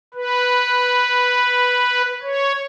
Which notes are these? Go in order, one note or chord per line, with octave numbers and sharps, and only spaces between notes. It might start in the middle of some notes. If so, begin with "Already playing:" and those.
B4
C#5